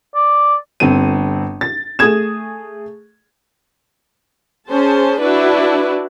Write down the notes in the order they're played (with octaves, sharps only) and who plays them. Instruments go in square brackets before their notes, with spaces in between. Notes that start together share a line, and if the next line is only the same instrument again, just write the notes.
[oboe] D5
[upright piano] G1 C4 D#7
A6
A3 G#4 D#6 G#6 E7
[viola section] C#4 G#4 C5 A5
D4 E4 F#4 B4